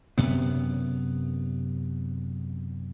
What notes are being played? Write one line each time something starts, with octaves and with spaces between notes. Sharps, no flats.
F#2 C3 B3